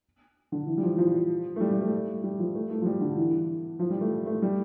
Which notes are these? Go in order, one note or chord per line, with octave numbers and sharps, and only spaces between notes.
D3
E3
G3
F3
E3
F3
A3
G3
G3
A3
G3
F3
A3
A3
F3
G3
D3
E3
F3
G3
A3
A3
G3